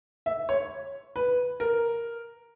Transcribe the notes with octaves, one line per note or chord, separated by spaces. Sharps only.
E5
C#5
B4
A#4